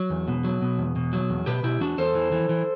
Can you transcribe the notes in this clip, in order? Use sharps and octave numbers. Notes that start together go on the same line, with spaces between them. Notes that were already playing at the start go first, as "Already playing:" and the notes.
Already playing: F#3
E2
B2
F#3
B2
E2
B2
F#3
E2
B2 G4 B4
B2 E4 G4
E2 D4 F#4
E2 A4 C5
E3
E3
E3